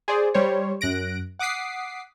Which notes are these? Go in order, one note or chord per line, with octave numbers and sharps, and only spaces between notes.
G#4 C5 D5
G3 C5 C#5
F#2 F#6 A#6 D7
F#5 D6 D#6 B6 C7